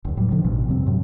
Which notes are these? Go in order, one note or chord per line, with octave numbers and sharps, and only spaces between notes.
F1 C#2
A2 F#3 G3
D3 D#3 F3
A1 B2
F2 C3 G3 C4
F#2 A2 F#3